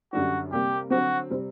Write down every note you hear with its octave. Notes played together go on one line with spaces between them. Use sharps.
F#2 D3 G3 D4 F#4
C3 G3 A#3 G4
D3 F#3 C4 F#4
C3 G3 C4